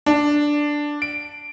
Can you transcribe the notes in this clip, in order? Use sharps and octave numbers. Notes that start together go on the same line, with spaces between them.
D4
D7